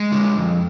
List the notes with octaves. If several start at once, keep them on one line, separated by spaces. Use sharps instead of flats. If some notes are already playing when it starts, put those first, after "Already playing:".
Already playing: G#3
D3
F2